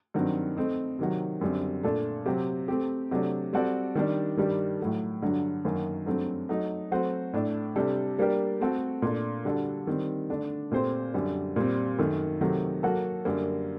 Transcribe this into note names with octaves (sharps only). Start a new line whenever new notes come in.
G2 D#3 F#3 C4
A3 C4 D#4
C3 D#3 F#3
F#2 D3 G3 C4
A#2 A3 D4 A4
C3 F#3 C4 G4
A3 C4 G4
C3 F#3 A3 D4
G3 C4 F#4 A4 D5
D#3 G3 D4
G2 D#3 G3 D4 G4
A2 F#3 A3
G2 D3 F#3
F#2 D#3 F#3 A#3
G2 F#3 A3 C4
F#3 A3 D#4
F#3 A3 C4 F#4 C5
A2 A3 D4
C3 G3 D4 A4
G3 A#3 D4 G4 A#4
A3 C4 F#4 A4
A#2 A3 D4
D3 G3 D4 F#4 A4
D#3 G3 C4
D3 A3 D4
A#2 A3 C4 G4 C5
F#2 D3 G3
A#2 G3 C4
F#2 D#3 A3
C3 D#3 F#3 A3
F#3 A#3 F#4 A4
F#2 D3 G3 A#3